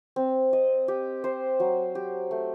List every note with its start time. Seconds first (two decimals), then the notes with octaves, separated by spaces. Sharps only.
0.16 C4
0.53 D#5
0.88 G4
1.24 C5
1.60 F#3
1.95 G4
2.31 A3